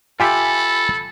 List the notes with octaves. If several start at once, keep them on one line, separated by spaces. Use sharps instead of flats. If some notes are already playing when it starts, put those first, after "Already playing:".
F4 G4 A4 E5 G#5 B5